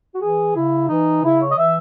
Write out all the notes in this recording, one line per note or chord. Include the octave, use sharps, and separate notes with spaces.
F#4
E3 G#4
C#3 E4
E3 D#4
C#3 E4
C#5
D#5
E3 E5